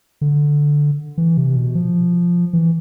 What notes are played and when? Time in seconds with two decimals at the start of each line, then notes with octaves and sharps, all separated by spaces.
0.21 D3
1.18 E3
1.37 C3
1.56 B2
1.75 F3
2.53 E3